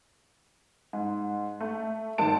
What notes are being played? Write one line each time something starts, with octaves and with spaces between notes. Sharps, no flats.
G#2
A3
G#1 D#3 A5 D7